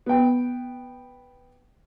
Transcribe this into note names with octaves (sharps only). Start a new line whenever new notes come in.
B3 G5